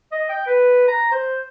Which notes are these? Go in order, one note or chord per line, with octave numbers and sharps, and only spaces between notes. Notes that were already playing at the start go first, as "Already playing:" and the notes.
D#5
G5
B4
A#5
C5